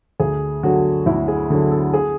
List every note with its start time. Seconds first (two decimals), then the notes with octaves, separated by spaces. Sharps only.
0.20 D2 G#4
0.63 D3 F#3 F#4
1.06 D2 E4
1.28 G#4
1.50 D3 F#3
1.71 A4
1.93 G#4